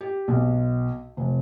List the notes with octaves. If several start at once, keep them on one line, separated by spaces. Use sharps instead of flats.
G4
B1
F1